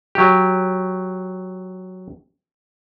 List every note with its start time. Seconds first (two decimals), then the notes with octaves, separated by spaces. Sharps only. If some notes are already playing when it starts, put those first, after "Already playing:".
0.15 F#3 G4